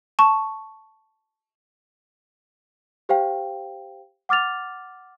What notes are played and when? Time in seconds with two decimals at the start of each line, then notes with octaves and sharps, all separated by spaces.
0.19 A5 C#6
3.09 G4 C5 F5 G5
4.29 F#5 D6 F6 A6 F7